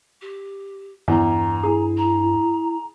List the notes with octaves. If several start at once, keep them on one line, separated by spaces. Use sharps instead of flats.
G4
E2 G2 A#5
E4 G#4
A#5